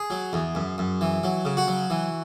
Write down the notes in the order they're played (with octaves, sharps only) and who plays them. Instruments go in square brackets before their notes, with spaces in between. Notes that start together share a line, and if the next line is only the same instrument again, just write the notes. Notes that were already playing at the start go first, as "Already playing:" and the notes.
Already playing: [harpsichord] G#4
F#3
E2
F#2
F#2
E3
F#3
C#3
F#4
F#3
E3